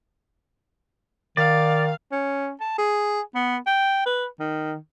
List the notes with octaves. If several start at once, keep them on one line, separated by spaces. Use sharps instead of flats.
D#3 D5 F5
C#4
A5
G#4
B3
G5
B4
D#3